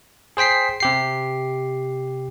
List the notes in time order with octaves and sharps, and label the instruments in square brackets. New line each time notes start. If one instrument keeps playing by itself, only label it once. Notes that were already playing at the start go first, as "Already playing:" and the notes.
[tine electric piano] G#4 C5 G5 B6 C7
C3 G4 C7